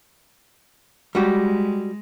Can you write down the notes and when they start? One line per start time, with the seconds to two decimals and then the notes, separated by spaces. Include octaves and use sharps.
1.15 G3 G#3 F#4 G4